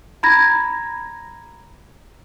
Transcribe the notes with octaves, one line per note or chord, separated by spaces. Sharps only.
A#5 B5 G#6 A#6